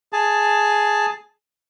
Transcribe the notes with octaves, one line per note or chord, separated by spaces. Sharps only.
G#4 A5